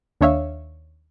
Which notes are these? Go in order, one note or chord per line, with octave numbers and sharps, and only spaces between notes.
D#2 D4 C#5 E5 F5